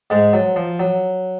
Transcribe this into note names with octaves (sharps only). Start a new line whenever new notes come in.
G#2 G#3
F#3
F3
F#3